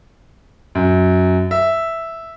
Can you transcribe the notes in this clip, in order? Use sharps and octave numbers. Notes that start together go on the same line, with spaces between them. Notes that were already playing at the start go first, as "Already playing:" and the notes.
F#2
E5